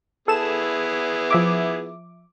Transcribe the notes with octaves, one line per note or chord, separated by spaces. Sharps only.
B3 E4 G#4 A4 E7
F3 E5 D6